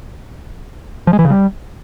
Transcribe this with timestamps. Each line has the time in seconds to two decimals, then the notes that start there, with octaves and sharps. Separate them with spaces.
1.07 F3
1.13 G#3
1.19 E3
1.25 C#3
1.30 G3